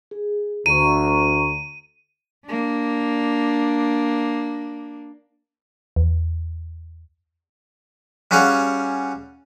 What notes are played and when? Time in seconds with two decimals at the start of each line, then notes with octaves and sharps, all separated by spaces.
0.11 G#4
0.66 D2 A#5 C#6 D#7
2.45 A#3 D4
5.96 E2
8.31 G3 C#4 F#4 G#4 F5 F#5